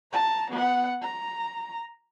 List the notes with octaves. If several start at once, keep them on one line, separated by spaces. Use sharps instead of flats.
A5 A#5
B3 F#5
A#5